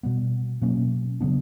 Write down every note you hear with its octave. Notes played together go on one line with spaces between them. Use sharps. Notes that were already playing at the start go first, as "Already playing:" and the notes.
B2 G3 B3
B2 F#3 A#3 C#4
C#3 F#3 B3 D4